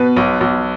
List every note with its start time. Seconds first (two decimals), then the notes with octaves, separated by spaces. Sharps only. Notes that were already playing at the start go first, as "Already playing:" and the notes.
Already playing: B2 B4
0.17 B1
0.41 B1